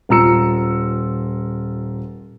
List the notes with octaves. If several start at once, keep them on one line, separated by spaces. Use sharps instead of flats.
D#1 F4 A#5 E6 C#7